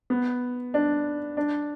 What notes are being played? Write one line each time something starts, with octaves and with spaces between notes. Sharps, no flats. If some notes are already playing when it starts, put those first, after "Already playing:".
B3
D4
D4